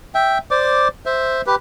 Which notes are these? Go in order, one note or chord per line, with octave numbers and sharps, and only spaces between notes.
E5 G5
C5 D5 D6
C5 E5
G4 B4